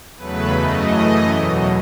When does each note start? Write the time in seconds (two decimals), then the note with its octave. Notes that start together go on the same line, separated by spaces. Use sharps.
0.16 E2 C#3 F#3 A3 B4
0.54 F#2 C#3 E3 A3 D#5
0.94 F#2 E3 A3
1.32 E2 B2 F#3